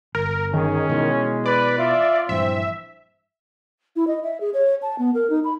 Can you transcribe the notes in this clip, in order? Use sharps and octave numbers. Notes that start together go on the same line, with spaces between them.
G1 A#4
D#3 C#4 G#4
B2 E3 G#3
B4 D5
F4 E5
A#1 G2 E3 C4 E5
E4
D#5
E5
G#4
C#5
A5
B3
A#4
D#4
B5